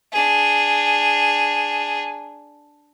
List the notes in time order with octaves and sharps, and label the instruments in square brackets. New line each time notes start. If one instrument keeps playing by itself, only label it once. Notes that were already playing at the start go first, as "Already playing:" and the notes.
[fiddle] D4 G#4